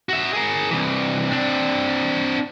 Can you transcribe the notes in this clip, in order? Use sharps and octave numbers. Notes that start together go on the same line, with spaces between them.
F#4 E5
G#4 A#4
C2 E3
C4 D4